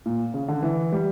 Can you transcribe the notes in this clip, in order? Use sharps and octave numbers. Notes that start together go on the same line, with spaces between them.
A#2
C#3
D3
E3
G3